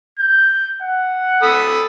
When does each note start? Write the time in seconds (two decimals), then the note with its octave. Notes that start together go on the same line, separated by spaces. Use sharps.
0.19 G6
0.82 F#5
1.42 A4 B5 D#6